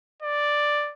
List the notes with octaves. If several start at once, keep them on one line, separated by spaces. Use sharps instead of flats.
D5